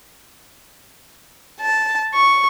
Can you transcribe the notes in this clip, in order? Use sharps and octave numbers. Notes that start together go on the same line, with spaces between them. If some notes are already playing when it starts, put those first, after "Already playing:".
A5
C#6